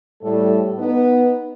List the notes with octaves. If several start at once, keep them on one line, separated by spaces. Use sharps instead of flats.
A2 G3 A4
B3 D#4